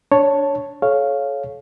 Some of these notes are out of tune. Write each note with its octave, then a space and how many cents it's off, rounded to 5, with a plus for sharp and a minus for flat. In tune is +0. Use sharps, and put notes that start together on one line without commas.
D4 -20 C#5 +0 A5 +0
A4 -40 C#5 +0 F5 +0